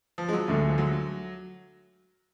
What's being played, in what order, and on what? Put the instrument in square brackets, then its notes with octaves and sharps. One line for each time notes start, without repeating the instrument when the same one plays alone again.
[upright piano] F3
G#3
F#3
[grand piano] D2 D3 G#3
[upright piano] F3
F#3